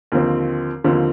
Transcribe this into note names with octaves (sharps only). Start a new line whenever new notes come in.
D#2 D3 F3 C4
D#2 D3 F3 C4